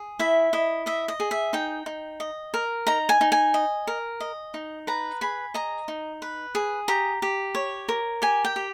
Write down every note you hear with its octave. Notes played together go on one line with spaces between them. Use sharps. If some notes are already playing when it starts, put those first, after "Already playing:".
Already playing: G#4
E4 E5
E4 D#5
D#5 E5
D#5
G#4
E5
D#4 G5
D#4
D#5
A#4
D#4 A#5
G#5
D#4
G#5
D#5
A#4
D#5
D#4
B4 A#5
G#4 B5
D#5 A#5
D#4
B4
G#4
G4 A#5
G4
C#5
A#4
G4 G#5
G5
G4